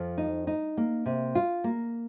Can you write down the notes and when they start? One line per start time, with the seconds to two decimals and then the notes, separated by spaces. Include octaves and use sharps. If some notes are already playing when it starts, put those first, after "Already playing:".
Already playing: F2 F3
0.18 D#4
0.47 D#4
0.77 A#3
1.06 C3
1.35 F4
1.64 A#3